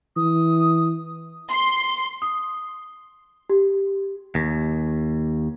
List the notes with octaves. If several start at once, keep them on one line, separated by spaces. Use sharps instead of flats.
E3 D#6
C6
D#6
G4
D#2